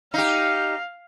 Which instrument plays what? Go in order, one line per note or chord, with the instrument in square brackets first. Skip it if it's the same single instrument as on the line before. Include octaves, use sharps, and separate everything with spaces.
[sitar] D#4 G4 [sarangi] F5